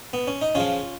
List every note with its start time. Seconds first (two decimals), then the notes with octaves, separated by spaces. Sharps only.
0.13 B3
0.27 C#4
0.42 D#4
0.55 C#3 F3 C#4 F4